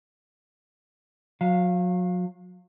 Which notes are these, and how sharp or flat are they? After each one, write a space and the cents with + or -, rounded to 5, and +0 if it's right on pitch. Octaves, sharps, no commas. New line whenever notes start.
F#3 -35 F5 +0